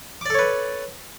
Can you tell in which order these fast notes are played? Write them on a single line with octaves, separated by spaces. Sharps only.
D6 D5 A4 C#5 B4